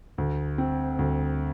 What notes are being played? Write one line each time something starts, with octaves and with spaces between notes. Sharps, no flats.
D2
C4
D2